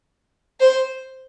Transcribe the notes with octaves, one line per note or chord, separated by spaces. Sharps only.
C5